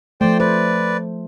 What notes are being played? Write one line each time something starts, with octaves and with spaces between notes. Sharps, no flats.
F3 A3 C5 D5 G5
B4 C5 D5